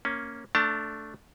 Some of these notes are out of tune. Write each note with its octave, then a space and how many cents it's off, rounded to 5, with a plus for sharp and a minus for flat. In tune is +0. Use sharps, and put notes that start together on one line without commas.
A#3 +0 C#4 +0
A3 +0 D4 -15 A5 +35